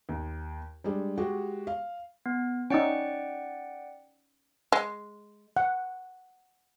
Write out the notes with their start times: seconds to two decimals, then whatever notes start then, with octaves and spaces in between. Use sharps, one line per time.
0.09 D#2
0.84 G3 G#3 D4
1.18 G#3 F#4 G4
1.67 F5
2.26 B3
2.70 C#4 D#4 D5 F#5 G5
4.72 G#3
5.57 F#5